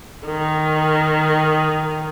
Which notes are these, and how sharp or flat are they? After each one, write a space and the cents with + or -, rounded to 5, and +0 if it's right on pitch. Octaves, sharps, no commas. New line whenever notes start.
D#3 -5